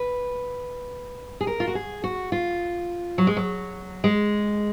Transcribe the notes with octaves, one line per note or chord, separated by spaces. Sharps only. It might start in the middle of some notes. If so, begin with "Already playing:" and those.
Already playing: B4
G#4
A#4
F4
F#4
G#4
F#4
F4
F#3
G#3
F#3
G#3